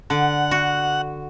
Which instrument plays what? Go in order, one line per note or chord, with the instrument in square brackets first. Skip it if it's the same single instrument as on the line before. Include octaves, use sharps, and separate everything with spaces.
[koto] D3 [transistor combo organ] F#5
[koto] F#4